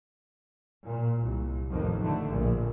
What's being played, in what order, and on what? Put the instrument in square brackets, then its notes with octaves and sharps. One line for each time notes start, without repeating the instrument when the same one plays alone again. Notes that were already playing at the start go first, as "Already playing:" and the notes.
[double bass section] A#2
C2
A1 F2 D#3
D3 A3
A#1